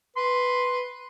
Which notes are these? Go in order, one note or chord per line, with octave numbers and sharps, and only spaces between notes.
B4 C6